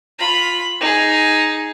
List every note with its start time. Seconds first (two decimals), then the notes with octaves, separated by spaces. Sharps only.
0.19 F4 B5
0.81 D#4 G#4